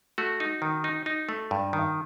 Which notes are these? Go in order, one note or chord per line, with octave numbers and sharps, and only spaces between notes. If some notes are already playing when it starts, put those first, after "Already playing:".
A3 F#4
D#4
D#3
D#4
D#4
A3
G2
D#3